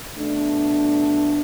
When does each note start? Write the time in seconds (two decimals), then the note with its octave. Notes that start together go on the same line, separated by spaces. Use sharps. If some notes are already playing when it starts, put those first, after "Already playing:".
0.18 B2 A3 D4